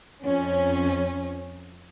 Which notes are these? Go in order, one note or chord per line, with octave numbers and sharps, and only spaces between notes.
F2 C#4